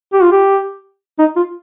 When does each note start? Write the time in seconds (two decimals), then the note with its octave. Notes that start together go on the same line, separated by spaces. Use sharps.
0.13 G4
0.22 F4
0.32 G4
1.19 D#4
1.36 F4